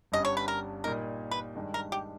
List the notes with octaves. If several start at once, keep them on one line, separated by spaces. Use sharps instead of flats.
G1 G2 G3 C#4 D#5
C#5
B4
A#4
A#2 G3 A#3 D#4 A#4
B4
G2 D#3 G#3
A#4
G4